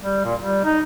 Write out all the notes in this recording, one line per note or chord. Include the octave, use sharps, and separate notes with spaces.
G3
A#2
G3
D#4